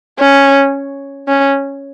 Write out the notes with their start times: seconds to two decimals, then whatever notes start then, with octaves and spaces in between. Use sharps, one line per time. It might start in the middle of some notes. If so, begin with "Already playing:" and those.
0.19 C#4
1.28 C#4